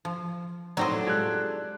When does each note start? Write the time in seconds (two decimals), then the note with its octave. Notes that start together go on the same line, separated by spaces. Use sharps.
0.05 F3
0.77 A2 F#3 C4 D4 D#4 A4 C5 D#5
1.07 G#3 F4 G4 F#6 G#6